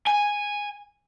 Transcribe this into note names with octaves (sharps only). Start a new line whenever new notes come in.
G#5